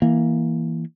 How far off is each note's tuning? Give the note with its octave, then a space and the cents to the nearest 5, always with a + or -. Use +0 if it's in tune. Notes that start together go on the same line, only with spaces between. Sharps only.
E3 +0 A#3 +10